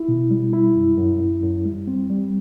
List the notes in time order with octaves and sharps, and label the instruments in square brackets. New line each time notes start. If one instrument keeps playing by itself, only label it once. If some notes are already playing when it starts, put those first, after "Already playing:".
Already playing: [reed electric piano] E4
B2
G3
E4
F#2
F#2
F#2
F#2
G3
C4
G3